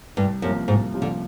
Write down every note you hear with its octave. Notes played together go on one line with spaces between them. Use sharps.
C2 G2
F#2 C3 F3 A#3 C#4
C2 G#2
C3 F3 A#3 C#4
D3